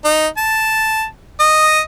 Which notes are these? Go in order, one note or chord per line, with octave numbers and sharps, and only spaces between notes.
D#4
A5
D#5